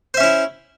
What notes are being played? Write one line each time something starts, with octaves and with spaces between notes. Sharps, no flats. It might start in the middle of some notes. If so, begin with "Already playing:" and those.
C#4 E4 C5 E5